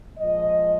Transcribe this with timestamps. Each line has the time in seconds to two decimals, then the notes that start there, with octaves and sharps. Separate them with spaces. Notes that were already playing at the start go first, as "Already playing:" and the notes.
0.19 A#2 F3 G#3 D#5